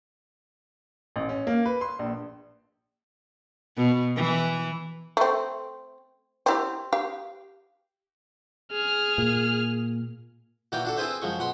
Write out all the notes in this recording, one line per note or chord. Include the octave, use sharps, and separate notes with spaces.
A1
C#4
A#3
B4
C6
A#1
B2
E3
A3 C4
C4 E4 G4
G4 F5
G#4 F6
A#2
A#2 E3 F#4 D5 F5 G5
D4 F#4 A4
C4 E4 G#4 B4 C5 E5
F#2 F3 G#3 C#6
B2 F#5 B5 C6